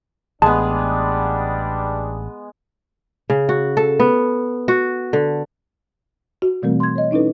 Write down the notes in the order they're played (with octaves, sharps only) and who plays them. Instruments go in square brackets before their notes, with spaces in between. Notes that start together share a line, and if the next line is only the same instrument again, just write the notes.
[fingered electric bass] A1 [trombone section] G3 D4 [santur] G#3 B3 [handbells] A5
[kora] C#3
F#4
A4
B3
F#4
D3
[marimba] F#4
B2 E3 G3 A3 C4 A#4
C6 G#6
C#5 D#5
C#4 D#4 E4 A4 B4